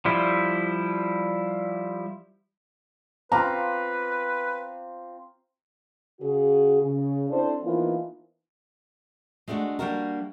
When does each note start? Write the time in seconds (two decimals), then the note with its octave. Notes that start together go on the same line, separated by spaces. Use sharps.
0.05 F3 G3 E4
3.32 C4 F4 B4 A#5 D6
6.21 C#3 F#4 G#4
6.82 C#3
7.30 C4 D4 E4 A4 C5
7.63 E3 F3 A#3 B3 D#4 F4
9.48 G#3 A3 B3 D4 F#4
9.79 G3 A#3 D4 F#4 A#4